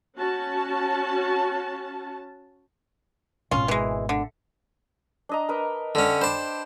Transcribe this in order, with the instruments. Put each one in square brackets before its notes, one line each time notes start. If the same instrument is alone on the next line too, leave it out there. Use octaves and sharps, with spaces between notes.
[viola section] C#4 F#4 A5
[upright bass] G#1 B2 [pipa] C#4 F4
[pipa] E3 G#3
D3
[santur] D4 D#5 A#5
A#4 B4 D#5
[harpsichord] D3 C#4 [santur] A4 G5
[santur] D4 G5 B5 [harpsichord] C5 A5